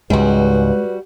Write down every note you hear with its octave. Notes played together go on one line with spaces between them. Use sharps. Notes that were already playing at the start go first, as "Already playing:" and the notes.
C#2 G#2 G3 G#3 F#4 B4